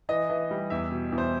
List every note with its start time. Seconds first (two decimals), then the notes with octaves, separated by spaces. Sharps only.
0.09 E3 D#5
0.30 E3
0.51 G3
0.70 E2 E5
0.91 B2
1.12 E2
1.18 C5